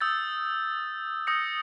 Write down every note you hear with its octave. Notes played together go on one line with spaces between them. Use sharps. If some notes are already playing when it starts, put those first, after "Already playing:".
D#6 E6 G6 A6
D#6 E6 G6 A#6 C#7